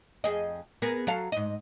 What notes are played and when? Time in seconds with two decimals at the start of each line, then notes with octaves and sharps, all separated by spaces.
0.24 F2 G#4 D#5
0.82 B3 G#4 A#4
1.07 F#3 A4 F5
1.32 G#2 D#5